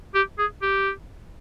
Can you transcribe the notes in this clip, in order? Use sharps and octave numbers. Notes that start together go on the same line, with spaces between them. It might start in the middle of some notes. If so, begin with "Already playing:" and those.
G4
G#4
G4